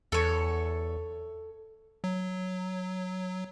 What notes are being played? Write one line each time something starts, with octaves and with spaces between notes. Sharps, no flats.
E2 A4 C#5
F#3